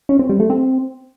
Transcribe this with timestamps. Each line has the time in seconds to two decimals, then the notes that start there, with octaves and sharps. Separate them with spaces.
0.09 C#4
0.19 C4
0.29 G3
0.40 A3
0.50 C4